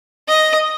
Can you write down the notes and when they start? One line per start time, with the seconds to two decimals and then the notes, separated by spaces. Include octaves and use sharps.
0.28 D#5